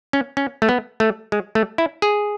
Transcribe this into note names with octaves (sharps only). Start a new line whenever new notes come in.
C#4
C#4
A3
B3
A3
G#3
A3
E4
G#4